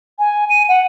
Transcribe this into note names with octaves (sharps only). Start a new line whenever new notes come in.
G#5
D#7
F#5